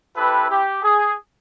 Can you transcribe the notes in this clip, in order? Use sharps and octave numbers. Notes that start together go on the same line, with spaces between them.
C4 E4 G4 A4 B4
G4
G#4